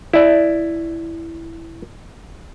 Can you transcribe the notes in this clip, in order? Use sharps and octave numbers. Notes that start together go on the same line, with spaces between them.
E4 D5